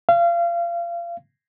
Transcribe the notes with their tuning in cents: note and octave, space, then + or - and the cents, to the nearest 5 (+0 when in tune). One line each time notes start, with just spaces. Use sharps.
F5 -30